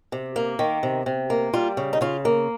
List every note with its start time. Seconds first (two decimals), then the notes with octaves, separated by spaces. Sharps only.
0.12 C3
0.36 A#3
0.59 D#3
0.83 C3
1.06 C3
1.30 A#3
1.53 G3 F4
1.77 C#3
1.93 D#4
2.01 C#3 F4
2.25 A#3